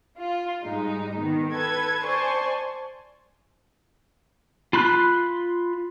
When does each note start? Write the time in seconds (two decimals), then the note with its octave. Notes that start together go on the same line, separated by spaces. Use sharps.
0.19 F4
0.65 G#2 G3 G#3 D#4
1.19 D#3 B3
1.51 A4 B4 G#6
2.05 C5 D5 G#5 A5 C6 C#6
4.73 F4 B5 C6 F#6